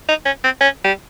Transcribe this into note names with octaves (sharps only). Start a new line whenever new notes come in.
D#4
C#4
C4
C#4
G3